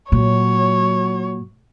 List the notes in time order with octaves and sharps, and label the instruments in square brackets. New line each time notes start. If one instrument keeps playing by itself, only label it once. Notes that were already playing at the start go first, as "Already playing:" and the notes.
[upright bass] A#2 [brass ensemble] F#3 [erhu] C#5